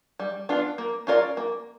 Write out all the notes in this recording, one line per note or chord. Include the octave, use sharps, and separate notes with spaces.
G3
B3 D4 F4
A#3
C#4 F4 A#4 D5
A#3